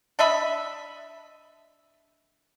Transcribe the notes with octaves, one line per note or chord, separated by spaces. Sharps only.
D4 D#5 E5 B5